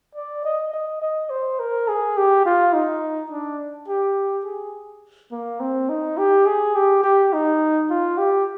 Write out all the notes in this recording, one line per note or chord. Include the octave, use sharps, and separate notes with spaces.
D5
D#5
D#5
D#5
C5
A#4
G#4
G4
F4
D#4
D4
G4
G#4
A#3
C4
D#4
G4
G#4
G4
G4
D#4
F4
G4